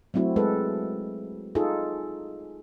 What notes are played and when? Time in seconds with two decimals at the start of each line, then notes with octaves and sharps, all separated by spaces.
0.14 F#3 A3 C4 E4 F#4
0.36 G#3 A4 B4
1.55 D#4 F4 G#4 A4